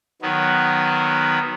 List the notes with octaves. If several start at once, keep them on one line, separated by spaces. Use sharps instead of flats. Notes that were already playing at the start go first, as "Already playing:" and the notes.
D#3 F#3 B3